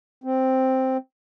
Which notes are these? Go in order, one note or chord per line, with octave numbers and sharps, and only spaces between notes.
C4